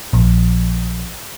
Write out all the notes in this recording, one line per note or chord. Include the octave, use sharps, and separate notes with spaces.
A#1